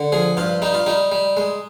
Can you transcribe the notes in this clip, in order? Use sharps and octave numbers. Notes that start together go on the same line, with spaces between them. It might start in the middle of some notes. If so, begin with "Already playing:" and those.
Already playing: D3
F3 G#4
G2 F4
G3 D#4
F4
G3 D#4
G3
G#3